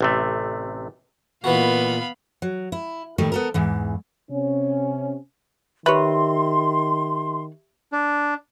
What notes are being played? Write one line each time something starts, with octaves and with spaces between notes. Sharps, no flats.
A1 C3 A3
A#2 E3 B3 F#4 F5 B5
F#3
E4
A2 D#3 G3 A3
B3 A4 A#4
E2 G#2 E3
C3 C#4
D#3 G4 B4 C#5 E5 C6
D4